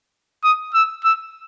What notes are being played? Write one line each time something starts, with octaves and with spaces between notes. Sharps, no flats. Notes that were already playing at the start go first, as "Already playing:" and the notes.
D#6
E6
E6